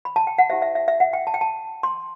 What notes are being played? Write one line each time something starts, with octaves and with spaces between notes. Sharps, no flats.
B5
A5
G5
F#5
E4 G4 C5 E5
E5
E5
E5
F#5
G5
A5
G5
A5
C6